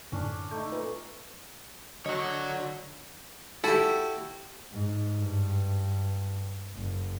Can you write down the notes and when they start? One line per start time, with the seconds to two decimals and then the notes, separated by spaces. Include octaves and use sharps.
0.12 F#2 A2 D3 C#4 D4 D5
0.51 A3 D#4 G6
0.72 A#2 B4
2.06 D3 F#3 F#4 C#5 D#5 C#6
3.64 E4 F#4 G4 A4
4.72 G#2
5.17 G2
6.74 F#1